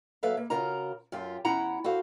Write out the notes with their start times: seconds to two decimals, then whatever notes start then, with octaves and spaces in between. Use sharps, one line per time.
0.23 F#3 A#3 A4 B4 E5 F5
0.37 A#3
0.50 C#3 F4 F#4 A#4 A#5
1.12 F#2 F4 G4
1.45 E2 C#4 E4 F#5 A#5
1.84 F#4 A4 C5 F5